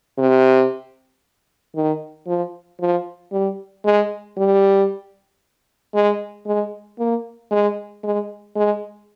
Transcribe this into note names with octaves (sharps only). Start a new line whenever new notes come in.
C3
D#3
F3
F3
G3
G#3
G3
G#3
G#3
A#3
G#3
G#3
G#3